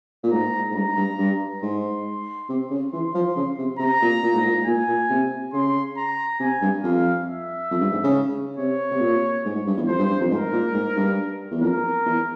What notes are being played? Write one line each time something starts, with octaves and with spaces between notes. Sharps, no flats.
A#2
G#2 A#5
G#2
G2 A#5
G2
G2
G#2 C6
C3
C#3
E3 C6
F3
C#3
C3
C3 A#5
A#2
A#2
G#2
A#2
A#2 G#5
A#2
C3
C#3 C6
A#5
C3 G#5
G2
F2 F5
E5
F2
G2
G#2
C#3
C3 C#5
C3
A#2
G#2
G#2
G2
E2
F2 C5
G2
G2
F2
G#2 A#4
A#2
G#2
G2
E2
F2 A#4
E2